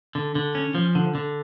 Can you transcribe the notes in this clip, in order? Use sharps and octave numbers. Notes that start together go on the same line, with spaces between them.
D3
D3
C#4
F3
D3
D3